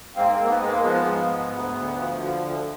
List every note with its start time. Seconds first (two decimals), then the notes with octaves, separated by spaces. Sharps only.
0.15 G#2 A#3 C4
0.33 A#3 C4
0.39 G#2
0.44 A#3
0.50 B3
0.61 G#3
0.67 A#3
0.84 F3 B3
1.06 G#2
1.29 G#2
1.51 D2
1.74 D2
1.96 F3
2.19 D3
2.41 D2